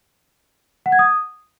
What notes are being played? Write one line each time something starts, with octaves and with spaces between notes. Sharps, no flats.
F#5
G#6
D#6